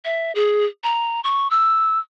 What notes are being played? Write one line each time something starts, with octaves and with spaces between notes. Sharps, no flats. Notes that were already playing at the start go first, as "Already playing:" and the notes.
E5
G#4
A#5
C#6
E6